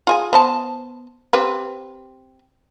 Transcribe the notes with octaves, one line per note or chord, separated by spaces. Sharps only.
F4 G#4 G#5
B3 C5 A5
C4 G4 B4